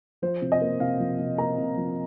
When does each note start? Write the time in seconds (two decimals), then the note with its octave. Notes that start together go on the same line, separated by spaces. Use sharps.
0.22 F3 C5
0.42 C3
0.52 D#5
0.61 A#3
0.80 C3 F5
1.00 F3
1.19 C3
1.38 A#3 A#5
1.58 C3
1.77 F3